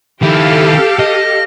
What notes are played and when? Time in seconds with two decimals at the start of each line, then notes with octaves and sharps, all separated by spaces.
0.22 D#3 E4 G4 A4 F5
0.99 D#5